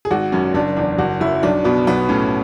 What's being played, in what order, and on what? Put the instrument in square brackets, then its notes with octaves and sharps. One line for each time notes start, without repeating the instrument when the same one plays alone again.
[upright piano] G#4
G#1 F#4
F#2 C#4
F#1 D4
E2 D4
F#1 F#4
F#2 E4
B1 D4
B2 B3
B1 B3
A2 C#4